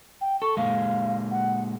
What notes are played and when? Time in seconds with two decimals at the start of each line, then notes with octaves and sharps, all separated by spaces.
0.21 G5
0.42 A4 C#6
0.57 A#2 G#3 F5
1.31 F#5